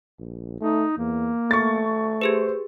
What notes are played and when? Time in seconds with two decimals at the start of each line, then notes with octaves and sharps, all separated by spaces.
0.19 A#1
0.61 A3 D#4
0.98 E2 A#3
1.51 A3 C#6 A6
2.21 G4 G#4 B4 C5